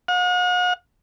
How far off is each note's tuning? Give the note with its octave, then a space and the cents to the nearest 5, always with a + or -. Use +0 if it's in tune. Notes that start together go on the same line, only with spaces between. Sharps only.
F#5 -45